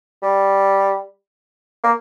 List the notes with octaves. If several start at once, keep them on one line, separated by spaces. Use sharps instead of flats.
G3
A#3